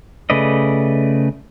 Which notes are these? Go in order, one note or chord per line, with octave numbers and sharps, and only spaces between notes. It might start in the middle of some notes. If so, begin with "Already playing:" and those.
C#3 A3 B4 D5 D#5